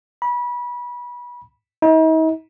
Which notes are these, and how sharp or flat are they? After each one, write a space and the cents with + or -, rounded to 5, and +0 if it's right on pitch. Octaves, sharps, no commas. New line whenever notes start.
B5 -25
D#4 +45